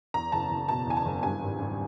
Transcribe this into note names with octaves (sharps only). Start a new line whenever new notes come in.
E2 A#5
F#1 A5
F#1
B2 A5
E2 G#5
A5
F#1
G2 G#5
G#1
G#1